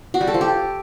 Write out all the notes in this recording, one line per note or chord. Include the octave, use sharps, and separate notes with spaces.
F#4
G3
A4
F3
G4